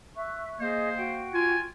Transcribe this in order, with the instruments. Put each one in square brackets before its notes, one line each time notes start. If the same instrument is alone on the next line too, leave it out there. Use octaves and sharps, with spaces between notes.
[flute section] E5 C#6 F#6
[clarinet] A#3 [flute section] G#4 D#5 G6 [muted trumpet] C5
[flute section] F#4 G5
[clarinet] F4 [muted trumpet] G#5